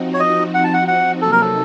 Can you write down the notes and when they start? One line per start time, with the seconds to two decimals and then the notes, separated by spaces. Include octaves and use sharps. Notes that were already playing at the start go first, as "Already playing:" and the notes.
Already playing: F3 C4 D#4 F#4
0.14 C#5
0.20 D#5
0.54 F#5
0.64 A5
0.74 F#5
0.88 F#5
1.22 C3 F#3 A#3 D#4 A4
1.32 A#4
1.41 A4